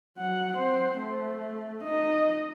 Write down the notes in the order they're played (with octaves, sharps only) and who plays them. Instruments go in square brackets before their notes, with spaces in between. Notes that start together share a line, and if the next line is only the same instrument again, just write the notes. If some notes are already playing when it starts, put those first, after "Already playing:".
[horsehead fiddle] F#3 F#5
C4 C5
A3
D#4 D#5